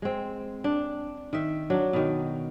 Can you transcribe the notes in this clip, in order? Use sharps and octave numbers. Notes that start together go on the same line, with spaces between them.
G#3 C4
D4
D#3 E5
F#3 D4
B2 D#3